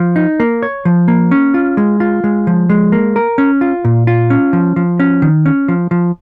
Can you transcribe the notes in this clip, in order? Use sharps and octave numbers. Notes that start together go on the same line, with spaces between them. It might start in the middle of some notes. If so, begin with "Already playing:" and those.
Already playing: F3
D#4
A#3
C#5
F3
A#3
C#4
F4
G#3
F4
G#3
F3
G#3
A#3
A#4
C#4
F4
A#2
F4
C#4
F3
F3
C#4
D#3
C#4
F3
F3